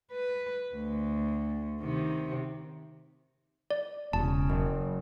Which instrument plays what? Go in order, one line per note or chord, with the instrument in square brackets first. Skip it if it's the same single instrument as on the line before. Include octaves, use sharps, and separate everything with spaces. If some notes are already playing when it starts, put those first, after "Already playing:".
[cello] B4
D2
C3 D#3
[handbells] D5
[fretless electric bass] E1 [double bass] C#3 [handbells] A5
[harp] F#1